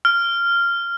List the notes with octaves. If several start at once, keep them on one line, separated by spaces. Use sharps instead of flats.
F6